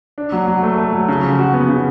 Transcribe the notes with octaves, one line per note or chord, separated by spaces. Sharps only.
D4
F#3
F#3
A3
A3
F#3
C#3
F3
F#4
B3
C#3